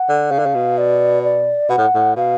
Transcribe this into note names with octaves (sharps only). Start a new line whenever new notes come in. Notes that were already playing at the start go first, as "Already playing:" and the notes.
Already playing: F#5
D3
C#3 F5
D3
C#3
B2
D5
D5
B2 F#5
A2
A2
B2 F5